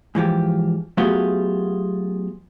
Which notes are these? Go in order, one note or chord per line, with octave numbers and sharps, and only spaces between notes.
G#2 E3 F3 G4
F#3 A3 B3 F4 G4 G#4